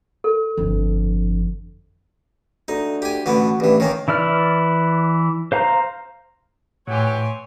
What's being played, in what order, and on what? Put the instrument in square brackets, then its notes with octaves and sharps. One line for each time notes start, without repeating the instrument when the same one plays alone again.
[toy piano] A4
[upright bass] G1 F2
[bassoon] D2 [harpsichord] D#4
[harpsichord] G4 G#5
[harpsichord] A1 D3 B3 [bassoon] F#4
[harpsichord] A1 E3 [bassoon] G2
[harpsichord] D#3 A#3 [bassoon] C#4
[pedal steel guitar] E3 E4 D5 F6
C5 F5 A#5
[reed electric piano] A2 [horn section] E3 F#3 G4 [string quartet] C#5 G#5 C6